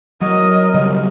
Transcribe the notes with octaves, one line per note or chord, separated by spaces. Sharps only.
F#3 A#4 D#5
C#3 F#3 G3